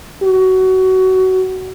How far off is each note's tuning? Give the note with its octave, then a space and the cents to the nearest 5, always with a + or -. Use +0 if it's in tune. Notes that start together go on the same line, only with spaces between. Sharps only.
F#4 +20